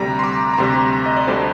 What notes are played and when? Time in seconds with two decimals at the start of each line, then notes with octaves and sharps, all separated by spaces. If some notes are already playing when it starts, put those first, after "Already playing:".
Already playing: D2 C3 G3 A#5
0.19 C6
0.24 D6
0.53 A#5
0.58 D2 C3 G3 C6
0.93 A#5
1.06 D#5
1.16 D5
1.27 D2 D3 G3 D4 C5